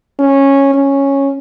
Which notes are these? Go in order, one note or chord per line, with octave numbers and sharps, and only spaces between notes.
C#4
C#4